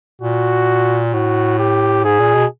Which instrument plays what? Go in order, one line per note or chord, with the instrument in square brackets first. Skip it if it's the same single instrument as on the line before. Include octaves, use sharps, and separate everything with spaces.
[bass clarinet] A#2 [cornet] F#4
[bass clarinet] A2 [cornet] F#4
[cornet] G4
[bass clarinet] G#2 [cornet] G#4
[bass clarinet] A#2
B2